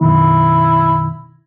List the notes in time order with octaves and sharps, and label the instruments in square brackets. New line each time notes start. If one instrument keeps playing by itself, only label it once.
[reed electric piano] F#2 B2 D#3 [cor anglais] E4